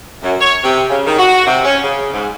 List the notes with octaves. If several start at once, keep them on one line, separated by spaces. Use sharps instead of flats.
F#2
C#5
C3
C#3
D#3
F#4
C3
C#4
C#3
G#2